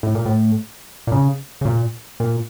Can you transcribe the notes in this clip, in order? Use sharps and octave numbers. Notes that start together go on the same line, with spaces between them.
A2
A#2
A2
A#2
C#3
C#3
A#2
A#2